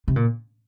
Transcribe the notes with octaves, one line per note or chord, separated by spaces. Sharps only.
C3
A#2